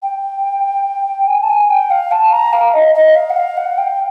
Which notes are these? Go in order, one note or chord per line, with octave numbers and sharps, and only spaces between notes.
G5
G#5
A5
G#5
G5
F5
A5
A#5
F5
D#5
D#5
F5
F#5
F5
F#5
G5